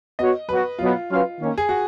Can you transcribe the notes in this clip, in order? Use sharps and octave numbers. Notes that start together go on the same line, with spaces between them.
B3 F#4 C#5 D#5
F#3 B3 F#4 B4
B2 F#3 B3 F4
F#3 C#4 F4 B4 F5
D#3 A#3 C#4
G#4
F#4